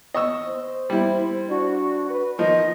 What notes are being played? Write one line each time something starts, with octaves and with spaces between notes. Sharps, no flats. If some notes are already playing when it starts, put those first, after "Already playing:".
D#5 C#6 E6
C5
G3 E4
D4 F#4
B4
D#3 F3 D#5